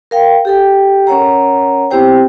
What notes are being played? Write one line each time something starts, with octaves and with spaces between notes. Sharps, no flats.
A#4 F5 G5
G4 A4 G5
C#4 A#4 C#5 F#5 A#5
B3 C4 E4 G4 C5 G5